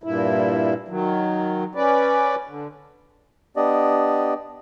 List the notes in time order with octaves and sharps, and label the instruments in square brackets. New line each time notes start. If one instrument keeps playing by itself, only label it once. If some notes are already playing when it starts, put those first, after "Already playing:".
[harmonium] G2 A#2 E4
D#3 F#3
C#4 B4 D5
D3
[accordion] B3 D4 G4 D5 D#5